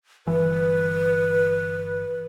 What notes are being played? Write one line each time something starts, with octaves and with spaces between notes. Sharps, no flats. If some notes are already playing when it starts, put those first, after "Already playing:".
G1 E3 B4